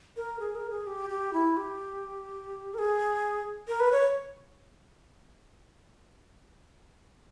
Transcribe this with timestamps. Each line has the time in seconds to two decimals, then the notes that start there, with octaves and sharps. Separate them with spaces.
0.16 A#4
0.39 G#4
0.55 A#4
0.70 G#4
0.87 G4
1.09 G4
1.33 E4
1.57 G4
2.74 A#4
2.78 G#4
3.68 A#4
3.80 B4
3.92 C#5